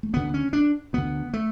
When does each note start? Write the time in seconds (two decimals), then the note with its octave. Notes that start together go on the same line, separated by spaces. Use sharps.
0.03 A3
0.13 D2 D3 B3
0.34 C#4
0.53 D4
0.93 D2 D3 B3
1.33 A3